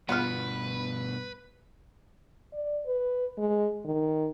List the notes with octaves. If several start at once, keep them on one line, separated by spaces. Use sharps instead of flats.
G2 B2 B3 F4 B4 F#5 B5 F6
D5
B4
G#3
D#3